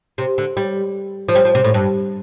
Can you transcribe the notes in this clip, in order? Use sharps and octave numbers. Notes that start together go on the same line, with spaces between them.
C3
D3
G3
F3
G3
F3
C3
A2
G2